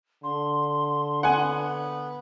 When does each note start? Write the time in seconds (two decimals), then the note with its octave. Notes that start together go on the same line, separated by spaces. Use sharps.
0.24 D3 C6
1.23 B3 F#5 G#5